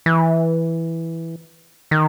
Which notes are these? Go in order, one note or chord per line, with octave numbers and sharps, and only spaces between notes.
E3
D#3